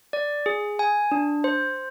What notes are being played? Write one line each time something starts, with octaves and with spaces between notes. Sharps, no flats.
D5
G#4
G#5
D4
C5